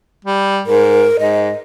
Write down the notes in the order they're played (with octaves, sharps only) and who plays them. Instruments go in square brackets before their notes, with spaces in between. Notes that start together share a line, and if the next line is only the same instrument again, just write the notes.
[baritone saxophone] G3
[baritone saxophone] G#2 [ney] A#4
[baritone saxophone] G#2 [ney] D#5